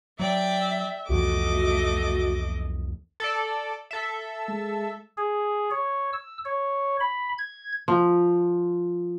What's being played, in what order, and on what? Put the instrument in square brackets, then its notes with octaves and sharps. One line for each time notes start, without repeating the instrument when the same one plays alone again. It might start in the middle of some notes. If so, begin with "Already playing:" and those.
[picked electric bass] F#3 [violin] D5 G5 [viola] E5
[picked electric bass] C2 F2 E3 [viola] A3 D#5 [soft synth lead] F#4 [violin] D6
[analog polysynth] A4 D5
A4 E5
[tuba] G#3
[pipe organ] G#4
C#5
E6
C#5
B5
G#6
[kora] F3